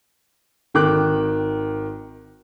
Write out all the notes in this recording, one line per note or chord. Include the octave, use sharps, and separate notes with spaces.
G#1 D#3 G5 D6 F#6